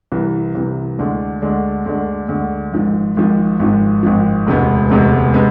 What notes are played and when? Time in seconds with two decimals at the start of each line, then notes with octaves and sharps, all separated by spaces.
0.12 C2 C3 E3
0.55 C2 C3 E3
0.99 D2 D3 G#3 D4
1.42 D2 D3 G#3 D4
1.86 D2 D3 G#3 D4
2.29 D2 D3 G#3 D4
2.73 G#1 G#2 F3
3.17 G#1 G#2 F3
3.59 G#1 G#2 F3
4.03 G#1 G#2 F3
4.47 E1 D2 C3 G#3 B3
4.90 E1 D2 C3 G#3 B3
5.34 C3 G#3 B3